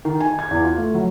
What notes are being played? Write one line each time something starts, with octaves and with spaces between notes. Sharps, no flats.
D#3
G#5
G#6
E2
F4
A3
F#3